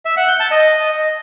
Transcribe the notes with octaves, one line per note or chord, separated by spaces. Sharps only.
E5
F#5
G6
A5
D#5